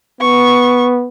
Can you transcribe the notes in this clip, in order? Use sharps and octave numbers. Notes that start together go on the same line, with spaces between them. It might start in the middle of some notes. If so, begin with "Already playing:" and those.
B3 C#6